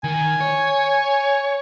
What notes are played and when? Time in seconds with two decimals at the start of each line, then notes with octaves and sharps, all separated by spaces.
0.04 D#3 G#5
0.41 C#5